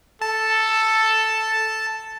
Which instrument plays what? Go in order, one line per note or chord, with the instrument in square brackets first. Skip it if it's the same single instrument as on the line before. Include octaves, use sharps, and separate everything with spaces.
[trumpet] A4 [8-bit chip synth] A5